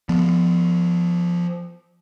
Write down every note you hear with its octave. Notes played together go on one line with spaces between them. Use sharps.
F3 B3